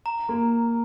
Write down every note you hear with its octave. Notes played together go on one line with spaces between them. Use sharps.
A#5
A#3